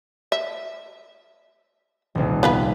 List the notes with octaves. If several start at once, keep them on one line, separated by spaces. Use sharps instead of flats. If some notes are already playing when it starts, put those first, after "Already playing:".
E5
D#1 C2
B3 F4 B4